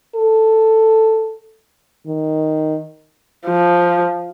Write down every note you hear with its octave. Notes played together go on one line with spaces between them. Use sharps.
A4
D#3
F3